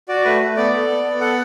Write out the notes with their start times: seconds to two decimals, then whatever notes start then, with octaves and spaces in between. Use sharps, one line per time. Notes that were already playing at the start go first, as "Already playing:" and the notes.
0.08 F#4 D5
0.24 A3 B4
0.41 A3
0.56 B3 D5
0.73 A4
0.88 B3
1.04 B3
1.21 A4 F#5